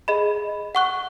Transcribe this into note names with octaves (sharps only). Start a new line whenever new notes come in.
G#4 D#5 B5
F#5 C#6 F#6